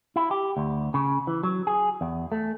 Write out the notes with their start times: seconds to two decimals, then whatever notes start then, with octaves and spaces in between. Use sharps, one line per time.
0.16 E4
0.31 G4
0.57 D2
0.94 C#3
1.27 E3
1.43 F#3
1.67 G#4
2.01 E2
2.32 A3